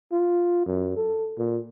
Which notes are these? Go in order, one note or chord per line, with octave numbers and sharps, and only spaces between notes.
F4
F#2
A4
A#2